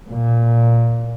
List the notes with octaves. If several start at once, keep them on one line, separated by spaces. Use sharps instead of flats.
A#2